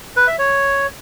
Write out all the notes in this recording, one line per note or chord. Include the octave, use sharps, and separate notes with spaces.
B4
E5
C#5